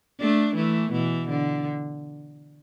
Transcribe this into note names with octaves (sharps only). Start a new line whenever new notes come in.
A3 D4
E3 A3
B2 E3
D3